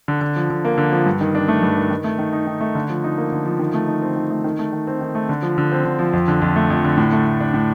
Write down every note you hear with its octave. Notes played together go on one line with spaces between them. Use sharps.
D3
D3
F3
D3
A#3
D3
F3
G2
D#3
D4
A3
G2
D#3
D#3
A3
D#3
D#4
D#3
A3
D3
F3
D#4
A#3
D3
F3
D#3
A3
D#4
C4
D#3
A3
D#3
A3
D#3
C4
D#3
A3
D3
F3
D3
C4
D3
F3
F2
D3
F2
A3
F2
D3
A2
A3
A2
D4
A2